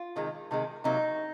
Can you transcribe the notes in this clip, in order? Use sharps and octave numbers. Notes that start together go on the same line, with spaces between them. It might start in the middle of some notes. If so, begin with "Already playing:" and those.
Already playing: F4
C3 D#3 G#3
C3 D#3 G#3
C3 F#3 A#3 D#4